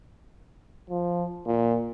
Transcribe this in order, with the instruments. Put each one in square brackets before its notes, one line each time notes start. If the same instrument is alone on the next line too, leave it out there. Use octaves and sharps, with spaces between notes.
[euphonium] F3
A#2